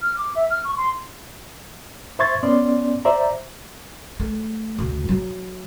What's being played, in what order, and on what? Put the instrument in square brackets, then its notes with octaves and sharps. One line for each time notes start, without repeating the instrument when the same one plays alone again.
[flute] F6
D6
E5
F6
C#6
C6
[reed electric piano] C5 E5 C6 C#6 G#6 A6
B3 C#4 D5 C6
C5 D5 E5 A#5
[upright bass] A3
D2 C#3
F#3